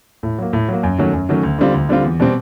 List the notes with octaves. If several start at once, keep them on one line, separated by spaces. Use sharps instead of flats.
A2
F#3 A#3
A2
F#3 A#3
F#2
D#3 F#3 A3 C#4
F#2
D#3 F#3 A3 C#4
D2
D3 G3 C4 F4
D2
D3 G3 C4 F4
E2
B2 G3 C4